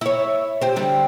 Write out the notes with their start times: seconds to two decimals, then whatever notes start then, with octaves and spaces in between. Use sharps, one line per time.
0.01 E4 C#5
0.61 G4 C5
0.76 D3 G3